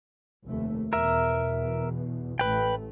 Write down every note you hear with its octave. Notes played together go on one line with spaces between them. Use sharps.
F1 D#2 A3
E2 B2 A#4 E5
A1 A3 B4 G5